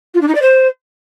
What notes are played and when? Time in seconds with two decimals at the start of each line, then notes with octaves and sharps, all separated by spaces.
0.14 F4
0.21 D4
0.28 D#4
0.34 D5
0.41 C5